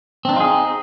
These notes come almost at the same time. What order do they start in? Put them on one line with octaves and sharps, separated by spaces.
C4 D4 D#4 F4 G#4